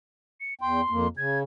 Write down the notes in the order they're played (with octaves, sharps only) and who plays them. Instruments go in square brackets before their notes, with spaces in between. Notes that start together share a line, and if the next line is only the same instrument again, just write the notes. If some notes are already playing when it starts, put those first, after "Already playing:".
[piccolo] C#7
[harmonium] E2 G5 [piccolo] C6
[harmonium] F2 A#3
[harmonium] C#3 [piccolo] G#6